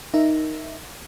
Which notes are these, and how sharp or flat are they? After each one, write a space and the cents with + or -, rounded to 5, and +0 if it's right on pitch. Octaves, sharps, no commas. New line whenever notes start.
D#4 +0 A#4 +0 E5 +0